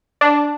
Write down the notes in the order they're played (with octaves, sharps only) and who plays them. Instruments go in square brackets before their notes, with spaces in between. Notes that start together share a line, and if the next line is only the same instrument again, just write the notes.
[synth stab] D4